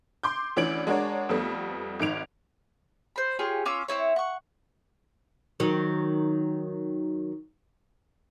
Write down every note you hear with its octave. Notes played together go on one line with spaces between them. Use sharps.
C6 D6 G6
D2 E3 C#4 D5 D7 F#7
G#3 D4 F#4 A#4 C#5 D5
F2 G3 A3 B3
G#1 D#3 D7 F7
C5 B5
F4 G4 G#4 C#5
C#4 F4 D6 E6
C4 C#4 E4 C#5
F#5 C#6
D#3 F#3